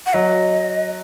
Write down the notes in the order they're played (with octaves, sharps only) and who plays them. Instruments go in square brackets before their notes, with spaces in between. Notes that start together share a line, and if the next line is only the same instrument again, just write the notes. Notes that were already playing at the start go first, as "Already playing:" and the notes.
[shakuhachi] F#5
[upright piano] F#3 [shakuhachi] D#5